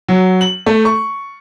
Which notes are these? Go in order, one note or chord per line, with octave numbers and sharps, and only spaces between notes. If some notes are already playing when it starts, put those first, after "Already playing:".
F#3
F#7
A3
C#6